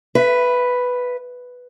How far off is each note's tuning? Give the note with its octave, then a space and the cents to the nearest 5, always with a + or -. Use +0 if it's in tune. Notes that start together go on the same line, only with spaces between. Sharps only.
B4 +0 E5 +30